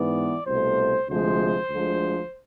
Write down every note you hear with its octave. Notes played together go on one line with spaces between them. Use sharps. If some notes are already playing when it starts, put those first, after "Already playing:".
Already playing: G#2 E3 B3 D5
C2 B2 A3 C5
D2 C3 F3 G#3 C5
D2 D3 F3 G#3